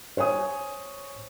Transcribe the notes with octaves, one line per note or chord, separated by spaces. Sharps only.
C5 C#5 G#5 D#6